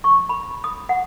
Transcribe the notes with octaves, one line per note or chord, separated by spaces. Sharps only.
C#6
B5
D#6
F#5